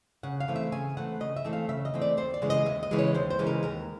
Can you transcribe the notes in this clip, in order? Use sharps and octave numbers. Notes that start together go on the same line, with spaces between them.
C#3 F#5
F5
E3 A3 C4
E5
C#3 G#5
E3 A3 C4 F#5
C#3 D#5
E5
E3 A3 C4
F5
C#3 E5
D#5
E3 A3 C4
D5
D#2 C5
D5
C#3 E3 G#3
D#5
D#2 E5
D#5
C#3 E3 G#3
C#5
D#2 C5
C5
C#3 E3 G#3
A#4
D#2 A#4